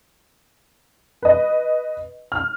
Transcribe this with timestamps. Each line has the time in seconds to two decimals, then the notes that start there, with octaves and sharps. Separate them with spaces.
1.22 B4 D#5
2.32 F6